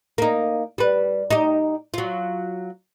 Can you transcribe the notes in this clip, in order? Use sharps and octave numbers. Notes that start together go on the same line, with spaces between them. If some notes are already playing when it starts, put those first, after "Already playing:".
A#3 D#4
G3 B4
D#4 G4
F#3 F4